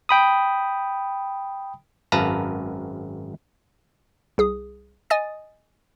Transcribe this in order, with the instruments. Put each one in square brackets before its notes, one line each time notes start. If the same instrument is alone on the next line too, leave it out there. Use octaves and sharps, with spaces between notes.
[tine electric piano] G5 B5 D#6
[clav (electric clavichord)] G#1 F#2 B4 F5 A5 A#5
[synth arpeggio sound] C2 G#4 D#6
D#5 G#5 D#6 A6